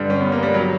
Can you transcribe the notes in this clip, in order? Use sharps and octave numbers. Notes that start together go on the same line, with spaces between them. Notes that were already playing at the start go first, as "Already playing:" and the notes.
Already playing: G2 D3 G3
C#4
B3
A#3
G3
F#3